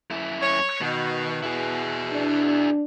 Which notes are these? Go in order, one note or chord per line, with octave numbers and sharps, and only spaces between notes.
F#2 E4
C#5
B2 D#3
E2 B2 E4 G#4
D4